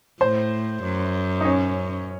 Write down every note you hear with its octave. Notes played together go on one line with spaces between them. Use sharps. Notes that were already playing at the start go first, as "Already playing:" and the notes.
A2 C5
F#2
D#4
C#4